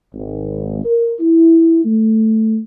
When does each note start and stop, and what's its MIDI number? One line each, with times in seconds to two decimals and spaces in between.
0.14 0.83 32
0.83 1.13 70
1.20 1.84 64
1.85 2.59 57